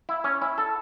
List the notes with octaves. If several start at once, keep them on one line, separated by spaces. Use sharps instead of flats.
E4
C#4
E4
A4